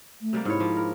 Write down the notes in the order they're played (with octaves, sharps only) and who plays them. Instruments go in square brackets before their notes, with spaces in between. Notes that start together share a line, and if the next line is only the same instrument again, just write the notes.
[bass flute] A3
[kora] C3 G3 A#3
[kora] G#2 C#5 [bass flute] E4
[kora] F3
A#4